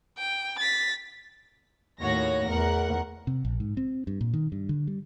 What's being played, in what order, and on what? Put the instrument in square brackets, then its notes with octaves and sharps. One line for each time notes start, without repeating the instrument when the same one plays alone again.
[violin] G5
A6 B6
[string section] D#2 A2 F#4 C#5 A#6
E2 A#4 F#5
[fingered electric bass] C3
A#1
G#2
C4
G2
A#2
D#3
G2
D3
G3